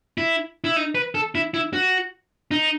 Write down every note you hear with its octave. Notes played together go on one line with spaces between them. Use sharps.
E4
E4
D#4
B4
A4
E4
E4
F#4
D#4